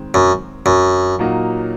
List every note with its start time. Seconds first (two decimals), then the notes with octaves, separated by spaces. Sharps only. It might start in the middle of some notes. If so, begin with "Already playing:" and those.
Already playing: D#3 G#3 C4
0.14 F#2
0.66 F#2
1.19 A#2 F#3 A#3 D#4 F#4